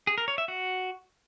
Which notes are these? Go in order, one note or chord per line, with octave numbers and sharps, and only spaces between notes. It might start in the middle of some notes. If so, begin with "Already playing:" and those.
G#4
A#4
C#5
E5
F#4